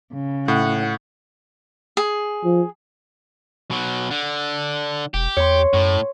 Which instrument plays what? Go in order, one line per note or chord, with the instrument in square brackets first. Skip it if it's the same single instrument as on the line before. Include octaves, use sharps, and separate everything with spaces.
[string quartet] C#3
[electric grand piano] A2 [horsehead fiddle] F#5
[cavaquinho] G#4
[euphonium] F3
[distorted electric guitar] B2 F#3
D3
[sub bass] E1 [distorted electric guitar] G4
[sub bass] E2 [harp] C#5 C6
[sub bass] F#2 [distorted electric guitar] A2